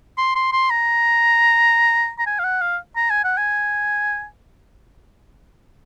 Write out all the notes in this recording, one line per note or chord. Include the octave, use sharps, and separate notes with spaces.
C6
C6
C6
A#5
A#5
G#5
F5
F#5
F5
A#5
G#5
F#5
G#5